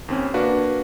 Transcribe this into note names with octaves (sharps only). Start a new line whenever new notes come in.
D#2 C4 C#4
A#3 D4 F#4 B4 F5